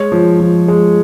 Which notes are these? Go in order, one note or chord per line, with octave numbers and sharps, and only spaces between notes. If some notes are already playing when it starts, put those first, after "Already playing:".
Already playing: G#3 C#5
F3
F3
G#3